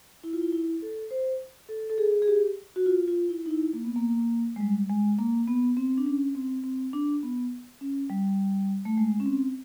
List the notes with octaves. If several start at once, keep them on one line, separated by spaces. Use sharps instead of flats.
E4
F4
E4
E4
A4
C5
A4
A4
G#4
G#4
G4
F#4
F4
F4
E4
D#4
E4
A#3
B3
A#3
G#3
G3
G#3
A#3
B3
C4
D4
C#4
C4
C4
D4
B3
C#4
G3
A3
G#3
C#4
C4